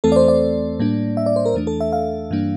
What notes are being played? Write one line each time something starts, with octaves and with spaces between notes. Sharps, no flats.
E2 E3 A3 C4 A4
D5
C5
D5
A2 G3 A#3 D4
E5
D5
C5
A#4
E2 E3 A3 D4
A4
E5
F5
G2 E3 G3 A#3 D4